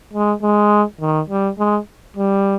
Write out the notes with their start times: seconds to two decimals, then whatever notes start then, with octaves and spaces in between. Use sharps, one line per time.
0.13 G#3
0.42 G#3
1.01 D#3
1.30 G3
1.58 G#3
2.17 G3